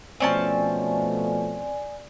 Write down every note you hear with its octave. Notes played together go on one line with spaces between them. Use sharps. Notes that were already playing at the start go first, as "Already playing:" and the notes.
B2 F3 A3 C4 C#4 D5 G#5 A5